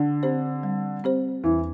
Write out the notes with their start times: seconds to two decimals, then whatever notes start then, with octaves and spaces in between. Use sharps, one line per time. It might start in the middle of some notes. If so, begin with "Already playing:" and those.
Already playing: D3
0.23 C4 G4 C5
0.63 G3
1.04 C4 G4 C5
1.44 E2 E3